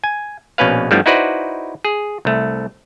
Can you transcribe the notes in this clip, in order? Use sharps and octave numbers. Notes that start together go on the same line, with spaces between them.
G#5
A#1 B2 C#4 B4 F5
G2 F3 G3 A3 B3 E4
D#4 E4 F#4 B4 C5 D5
G#4
C2 A3